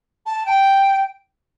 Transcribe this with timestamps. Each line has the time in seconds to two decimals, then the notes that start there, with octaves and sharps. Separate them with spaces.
0.26 A5
0.46 G5